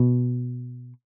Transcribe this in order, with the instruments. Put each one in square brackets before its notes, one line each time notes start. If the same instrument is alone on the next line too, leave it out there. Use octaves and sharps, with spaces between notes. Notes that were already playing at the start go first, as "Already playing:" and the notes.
Already playing: [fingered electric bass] B2